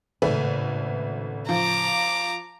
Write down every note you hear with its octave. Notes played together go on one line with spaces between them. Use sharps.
G#1 A2 C#3 A3 B4
F3 A#5 D6